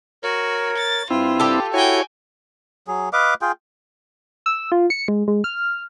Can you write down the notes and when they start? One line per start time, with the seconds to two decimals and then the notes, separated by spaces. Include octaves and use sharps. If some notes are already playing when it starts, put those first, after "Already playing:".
0.23 F#4 A#4 C#5
0.78 A6
1.10 G2 C4 E4 F4
1.40 G4 A4
1.74 E4 F#4 C#5 G5 G#5
2.87 F#3 G#4
3.13 B4 D#5 F5 D6
3.42 F4 G#4 G5
4.46 E6
4.72 F4
4.90 C#7
5.08 G#3
5.28 G#3
5.44 F6